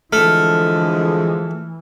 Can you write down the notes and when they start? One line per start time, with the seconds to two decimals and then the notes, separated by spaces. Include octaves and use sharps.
0.13 D3 E3 F3 G#3 A3 F6